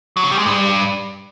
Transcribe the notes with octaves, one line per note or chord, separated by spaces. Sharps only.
F#3
C#3
G3
G#3
G2